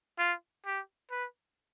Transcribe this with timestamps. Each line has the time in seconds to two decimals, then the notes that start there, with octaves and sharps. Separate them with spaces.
0.19 F4
0.66 G4
1.11 B4